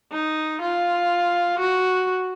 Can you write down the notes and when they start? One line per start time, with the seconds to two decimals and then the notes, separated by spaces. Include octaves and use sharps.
0.12 D#4
0.62 F4
1.59 F#4